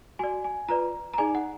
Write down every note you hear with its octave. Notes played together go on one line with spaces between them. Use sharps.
F#4 D5 G#5
G#5
F4 B4 D5 A#5
A#5
D#4 G#4 D5 G#5
F#5